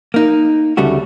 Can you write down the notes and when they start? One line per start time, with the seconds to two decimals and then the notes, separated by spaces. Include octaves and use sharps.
0.14 A#3 D#4
0.77 D2 C#3 G3 A3 F#4